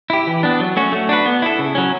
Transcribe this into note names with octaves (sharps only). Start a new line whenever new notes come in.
E4 G4
E3
B3 D4
F#3
A3 C#4 F#4
A3
D4 F#4 B4
B3
E4 A4
C#3
F#3 C#4